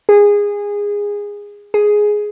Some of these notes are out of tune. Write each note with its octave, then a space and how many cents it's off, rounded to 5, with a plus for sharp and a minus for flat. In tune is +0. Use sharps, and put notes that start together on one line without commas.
G#4 -20
G#4 +5